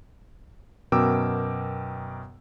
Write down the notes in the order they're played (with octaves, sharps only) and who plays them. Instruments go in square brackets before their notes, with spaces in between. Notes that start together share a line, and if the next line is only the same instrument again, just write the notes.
[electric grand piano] F#2 B2 A#4 G5 D6 E6